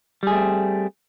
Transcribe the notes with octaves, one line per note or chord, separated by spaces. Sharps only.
G3 A3 C4 G#4